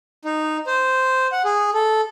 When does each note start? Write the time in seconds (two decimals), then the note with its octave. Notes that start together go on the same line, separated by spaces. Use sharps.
0.25 D#4
0.67 C5
1.32 F#5
1.45 G#4
1.74 A4